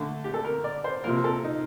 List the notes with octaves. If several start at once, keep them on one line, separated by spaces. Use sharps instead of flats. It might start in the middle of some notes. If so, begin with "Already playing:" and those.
Already playing: D3 A3 A4
G4
A4
A#4
D5
C5
C3 F3 A#3 A#4
A4
D#4